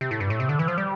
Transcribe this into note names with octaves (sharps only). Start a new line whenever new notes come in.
C3
A2
G2
A2
C3
D3
E3
F3
G3